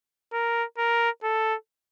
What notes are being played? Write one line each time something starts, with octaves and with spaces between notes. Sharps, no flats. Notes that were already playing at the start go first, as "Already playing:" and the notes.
A#4
A#4
A4